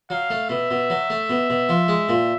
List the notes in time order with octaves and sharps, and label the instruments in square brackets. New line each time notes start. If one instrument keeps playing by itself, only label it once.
[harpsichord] F#3 [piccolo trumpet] F5
[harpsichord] A3
[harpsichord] B2 [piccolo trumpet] E5
[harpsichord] B2
F#3
A3
B2
B2
F3
G#3
A#2